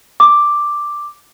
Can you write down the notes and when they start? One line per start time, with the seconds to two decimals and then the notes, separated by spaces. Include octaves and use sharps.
0.20 D6